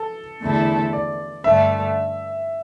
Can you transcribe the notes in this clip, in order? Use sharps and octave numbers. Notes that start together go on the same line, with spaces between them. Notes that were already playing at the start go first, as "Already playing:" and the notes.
Already playing: A4
E2 D3 A3 E4 A4
D5
G2 D3 A3 E5